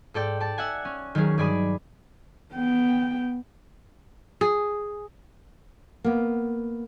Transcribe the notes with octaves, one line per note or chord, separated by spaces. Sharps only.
G#2 A4 D5 G5
D5 A5
E5 F#5 G#5
C#4
D#3 F#3 C#4 G#4
G2 G#4 D5 G#5 B5 D#6
B3 G5
G#4
A#3 B3